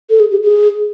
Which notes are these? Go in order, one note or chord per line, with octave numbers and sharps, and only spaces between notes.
A4
G#4
G4
G#4